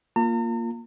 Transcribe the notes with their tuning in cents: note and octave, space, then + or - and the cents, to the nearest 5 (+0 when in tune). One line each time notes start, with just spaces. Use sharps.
A#3 +0 F4 +0 A#5 -45